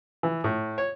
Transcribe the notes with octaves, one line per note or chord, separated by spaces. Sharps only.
E3
A2
C#5